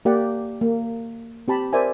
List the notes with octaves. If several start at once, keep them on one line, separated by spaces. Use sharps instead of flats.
A#3 G4 D5 F#5
A#3
C4 G4 A5 B5
A#4 C5 D5 E5 G#5